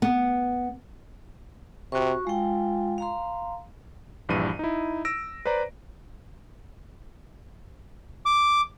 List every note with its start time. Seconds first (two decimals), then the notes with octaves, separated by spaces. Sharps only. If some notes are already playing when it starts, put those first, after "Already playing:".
0.02 B3
1.92 C3 F#4 C#6
2.27 G#3 F4 G5
2.98 F5 A#5 C6
4.29 A#1 G2 E3 D#7
4.59 D#4 E4
5.05 E6 A#6 D7
5.45 B4 C5 D5 A#5
8.25 D6